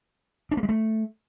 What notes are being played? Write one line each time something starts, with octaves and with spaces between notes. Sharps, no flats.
D4
A#3
G#3
A3